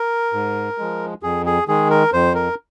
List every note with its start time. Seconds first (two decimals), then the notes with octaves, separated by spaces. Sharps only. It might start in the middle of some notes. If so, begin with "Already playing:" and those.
Already playing: A#4
0.33 G#2
0.78 F3 G#3
1.23 F2 G#4
1.46 G#4
1.68 D#3 G#3 G#4
1.90 A#4
2.13 F2 C5
2.35 A#4